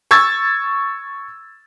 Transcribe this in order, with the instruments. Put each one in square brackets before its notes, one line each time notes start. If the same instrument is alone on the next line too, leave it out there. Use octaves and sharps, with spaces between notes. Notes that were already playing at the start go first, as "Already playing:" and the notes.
[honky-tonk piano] C#6 E6 G#6 A6